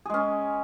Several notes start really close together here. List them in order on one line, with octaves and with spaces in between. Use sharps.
G#4 G#3 C#4